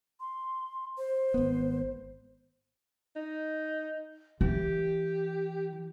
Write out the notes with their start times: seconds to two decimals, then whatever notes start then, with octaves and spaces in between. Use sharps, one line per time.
0.20 C6
0.98 C5
1.34 G#1 B3
3.16 D#4
4.41 E3 G4